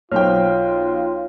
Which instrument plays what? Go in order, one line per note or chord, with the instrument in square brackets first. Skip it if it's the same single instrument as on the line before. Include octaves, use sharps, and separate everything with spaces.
[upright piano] B1 C5 G5 [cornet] F4 [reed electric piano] C#5 F6